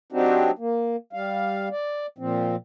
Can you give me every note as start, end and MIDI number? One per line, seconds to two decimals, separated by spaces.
0.12 0.51 54
0.12 0.51 60
0.12 0.51 62
0.12 0.51 63
0.12 0.51 66
0.12 0.51 67
0.59 0.96 58
1.13 1.69 55
1.13 1.69 77
1.71 2.06 74
2.18 2.56 46
2.18 2.56 53
2.18 2.56 60